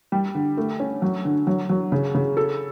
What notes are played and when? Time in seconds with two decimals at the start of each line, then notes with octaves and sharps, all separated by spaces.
0.12 G3
0.35 D3
0.57 A3
0.80 C#4
1.02 F#3
1.25 D3
1.47 F#3
1.69 F#3
1.92 C#3
2.14 C#3
2.37 A4